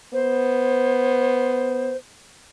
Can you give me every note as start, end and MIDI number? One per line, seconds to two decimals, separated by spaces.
0.13 1.94 59
0.13 1.96 72